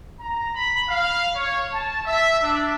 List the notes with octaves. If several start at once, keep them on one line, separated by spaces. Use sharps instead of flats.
A#5
B5
F5
C#5
A5
E5
D4